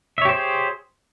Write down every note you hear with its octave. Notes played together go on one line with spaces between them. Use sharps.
G4 G#4 C5 C#5 E5